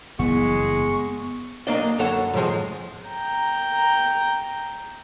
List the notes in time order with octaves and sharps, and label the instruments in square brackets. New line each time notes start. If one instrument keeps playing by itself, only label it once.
[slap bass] F#1 G2 E3 [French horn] G#3 [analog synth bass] B3 [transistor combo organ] C#6
[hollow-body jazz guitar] B1 A#3 D4 D5 D#5
F#2 D3 A4 C#5 F#5 A5
A2 C3 E3 F3 G#3
[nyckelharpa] G5 A#5